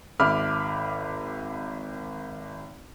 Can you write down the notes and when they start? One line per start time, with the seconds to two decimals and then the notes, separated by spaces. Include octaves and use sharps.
0.20 G#1 E5 B5 D6 F6